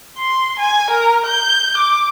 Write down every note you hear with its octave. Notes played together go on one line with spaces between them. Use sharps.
C6
G#5
A#4
G6
D6